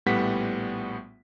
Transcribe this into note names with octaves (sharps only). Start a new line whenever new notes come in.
A#1 A2 G3 B3 F#5 B6